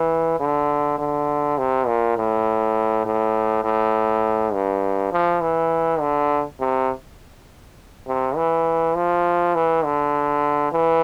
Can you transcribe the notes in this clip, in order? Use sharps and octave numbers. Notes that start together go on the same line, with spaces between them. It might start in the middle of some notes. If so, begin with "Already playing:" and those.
Already playing: E3
D3
D3
C3
A#2
A2
A2
A2
G2
F3
E3
D3
C3
C3
E3
F3
E3
D3
E3